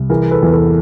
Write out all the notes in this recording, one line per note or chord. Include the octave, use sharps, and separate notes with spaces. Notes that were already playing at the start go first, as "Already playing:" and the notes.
Already playing: C2
E3 G#4 A#4
A4 B4
E2
A4 B4